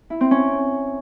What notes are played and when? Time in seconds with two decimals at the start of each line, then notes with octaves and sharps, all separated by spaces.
0.10 E4
0.21 C4
0.31 C#4